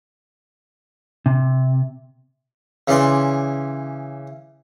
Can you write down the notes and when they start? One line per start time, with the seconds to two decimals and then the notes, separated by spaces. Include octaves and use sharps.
1.26 C3
2.88 C#3 E3 D5 C6